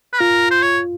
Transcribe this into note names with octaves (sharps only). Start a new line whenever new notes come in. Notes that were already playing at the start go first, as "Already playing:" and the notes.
B4
F4 A#4
C5
C#5